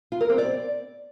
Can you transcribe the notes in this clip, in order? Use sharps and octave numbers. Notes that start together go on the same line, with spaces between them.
F4
A#4
C4
D5